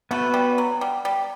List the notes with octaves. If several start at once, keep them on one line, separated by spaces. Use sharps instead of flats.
A3 B3 F#4 B4
G3
F#3
G3
G3